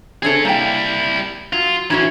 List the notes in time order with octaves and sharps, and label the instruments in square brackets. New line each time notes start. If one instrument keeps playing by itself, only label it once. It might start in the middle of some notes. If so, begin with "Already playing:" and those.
[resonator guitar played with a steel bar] C4 C#4 A4 [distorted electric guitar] G#4 C#5
[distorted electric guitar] G3 E4 [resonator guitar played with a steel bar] A#3 G5
[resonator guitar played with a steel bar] F#3 [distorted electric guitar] F4
[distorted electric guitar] E3 C#4 [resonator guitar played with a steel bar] E4 F#4 C#5